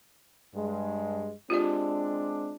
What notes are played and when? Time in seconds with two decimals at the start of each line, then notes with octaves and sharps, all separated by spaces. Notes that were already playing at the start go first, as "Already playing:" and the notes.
0.55 G2 G#3
1.50 G#3 C4 D4 F4 G4 D5